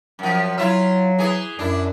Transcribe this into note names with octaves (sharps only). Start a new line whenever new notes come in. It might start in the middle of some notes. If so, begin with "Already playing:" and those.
F#2 F3
F#3 E4 F4 E5
E3 G#4
F#2 D4 E4